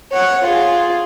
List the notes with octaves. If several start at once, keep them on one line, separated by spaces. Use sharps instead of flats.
C#5 F#5
F4 G#4